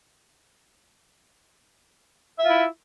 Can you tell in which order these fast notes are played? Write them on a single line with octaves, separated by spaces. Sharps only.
E5 F4 E4